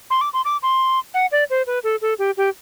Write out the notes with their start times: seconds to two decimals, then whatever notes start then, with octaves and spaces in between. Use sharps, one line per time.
0.10 C6
0.21 D6
0.33 C6
0.45 D6
0.63 C6
1.14 F#5
1.32 D5
1.50 C5
1.67 B4
1.84 A4
2.02 A4
2.19 G4
2.37 G4